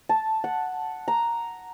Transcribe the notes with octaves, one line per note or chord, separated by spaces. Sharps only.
A5
F#5
A#5